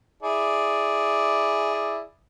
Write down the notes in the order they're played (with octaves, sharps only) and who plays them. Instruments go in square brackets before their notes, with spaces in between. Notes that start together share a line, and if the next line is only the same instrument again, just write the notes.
[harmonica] E4 G#4 D5